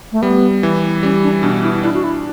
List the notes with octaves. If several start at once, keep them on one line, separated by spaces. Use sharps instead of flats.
A3
G3 B3
E3
G3 C#4
D4
B2 D4
E4
D4 E4
F#4
E4